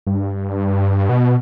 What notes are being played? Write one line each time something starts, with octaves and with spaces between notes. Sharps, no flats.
G2
B2